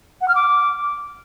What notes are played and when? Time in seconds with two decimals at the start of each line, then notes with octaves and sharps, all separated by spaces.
0.21 F#5
0.28 F6
0.35 D6